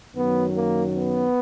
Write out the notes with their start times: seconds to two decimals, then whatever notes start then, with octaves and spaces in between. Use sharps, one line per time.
0.16 F#2 D#3 F#3 B3
0.56 A#3
0.96 B3